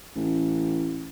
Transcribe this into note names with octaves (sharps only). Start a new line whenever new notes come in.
A1